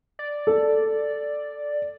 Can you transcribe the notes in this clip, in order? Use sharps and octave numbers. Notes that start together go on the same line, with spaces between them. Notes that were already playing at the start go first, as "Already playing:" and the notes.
D5
A4